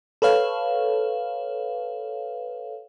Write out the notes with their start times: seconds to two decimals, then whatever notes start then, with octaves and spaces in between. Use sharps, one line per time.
0.22 A4 B4 C#5 F5